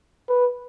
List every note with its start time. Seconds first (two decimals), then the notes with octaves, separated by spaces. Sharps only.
0.29 B4